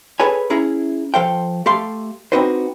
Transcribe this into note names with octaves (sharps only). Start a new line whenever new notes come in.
G#4 A4 B4 C#5 G#5
C#4 E4 G#4 A#5
F3 A4 C5 F5 G5
A3 G4 A4 F5 C6
C4 D4 D#4 F#4 B4 C5